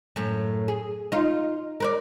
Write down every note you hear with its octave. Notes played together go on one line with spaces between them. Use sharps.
F#2 A2
G#4
D#4 F4
A#4 B4 D5